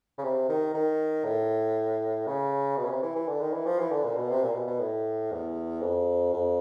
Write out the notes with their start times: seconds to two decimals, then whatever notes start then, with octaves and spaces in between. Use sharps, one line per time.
0.18 C#3
0.24 C3
0.49 D#3
0.74 D#3
1.25 A2
2.27 C#3
2.77 B2
2.85 C#3
2.91 C3
3.03 E3
3.16 E3
3.28 D3
3.41 D#3
3.53 E3
3.66 F3
3.79 E3
3.92 D3
4.04 A#2
4.17 B2
4.30 C3
4.43 A#2
4.55 B2
4.68 B2
4.80 A2
5.32 E2
5.82 F2
6.34 F2